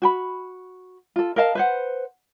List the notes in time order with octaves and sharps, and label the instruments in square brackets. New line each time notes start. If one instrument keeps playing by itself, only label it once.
[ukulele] F#4 G5 B5
F4 A4
A#4 D#5 F5 A5
B4 C5 F#5